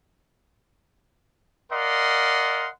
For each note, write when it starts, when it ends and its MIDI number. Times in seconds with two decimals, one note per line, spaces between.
1.72 2.70 70
1.72 2.70 74
1.72 2.70 75
1.72 2.70 77
1.72 2.70 78
1.72 2.70 84